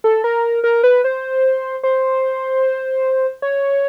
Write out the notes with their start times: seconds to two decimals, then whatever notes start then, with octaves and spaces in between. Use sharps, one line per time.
0.04 A4
0.24 A#4
0.64 A#4
0.83 B4
1.04 C5
1.83 C5
3.42 C#5